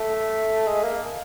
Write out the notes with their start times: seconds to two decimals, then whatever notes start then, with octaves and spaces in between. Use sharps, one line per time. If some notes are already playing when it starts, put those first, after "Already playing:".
Already playing: A3
0.67 G#3
0.83 A#3